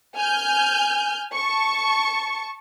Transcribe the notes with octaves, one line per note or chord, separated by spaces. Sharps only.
G#5 F6 G6
A5 C#6